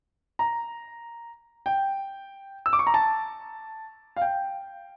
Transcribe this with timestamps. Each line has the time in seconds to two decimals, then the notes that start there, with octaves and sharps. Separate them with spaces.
0.39 A#5
1.66 G5
2.66 E6
2.73 D6
2.79 C#6
2.87 A#5
2.94 A5
4.16 F5
4.22 G5